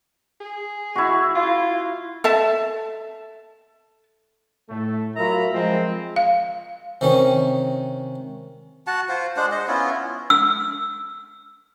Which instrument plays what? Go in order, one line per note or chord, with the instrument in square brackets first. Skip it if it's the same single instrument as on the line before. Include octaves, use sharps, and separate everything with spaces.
[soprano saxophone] G#4
[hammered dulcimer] E4 F#4
[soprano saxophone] F4
[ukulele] A4 E5 A5
[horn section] A2 A3
F#3 F4 A#4 E5 A#5 B5
F3 G#3 C4
[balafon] F5
[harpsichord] C3 D#3 C#4
[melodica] F#4 F#5 A5
F4 C5
G#3 D4 C5 F#5
C5 D#5
B3 C#4 E4 F4
[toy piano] E6